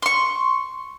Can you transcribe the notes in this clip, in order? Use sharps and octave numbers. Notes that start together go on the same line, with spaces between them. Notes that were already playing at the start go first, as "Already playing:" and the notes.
C6 C#6